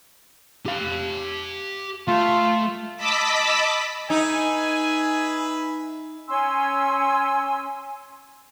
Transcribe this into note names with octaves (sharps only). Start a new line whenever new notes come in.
G4 F5
A3 F4
D#5 A5 B5 D6 E6 B6
D#4 G#4 B4 E5 G#5
C#4 G#5 C6 E6